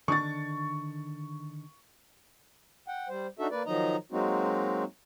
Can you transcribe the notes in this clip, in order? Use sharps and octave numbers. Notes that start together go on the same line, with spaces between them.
D3 D#3 D4 C#6 A6
F#5 G5
G3 C5
D4 D#4 F#4 A4 E5
A#3 B4 D5
D#3 F3 F#3 D#4 D#5 A#5
F#3 G#3 A#3 C4 D#4 F#4